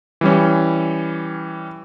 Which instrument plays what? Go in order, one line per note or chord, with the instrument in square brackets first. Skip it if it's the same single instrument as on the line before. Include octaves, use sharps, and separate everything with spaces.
[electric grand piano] E3 G3 C#4